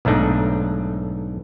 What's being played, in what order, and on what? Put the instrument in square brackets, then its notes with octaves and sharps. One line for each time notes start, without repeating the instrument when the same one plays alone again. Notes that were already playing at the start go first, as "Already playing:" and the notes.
[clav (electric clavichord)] B1 G#2 A3 D4 D#4